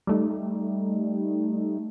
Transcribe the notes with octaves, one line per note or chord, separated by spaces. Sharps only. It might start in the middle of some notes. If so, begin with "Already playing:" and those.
G3 A3 D#4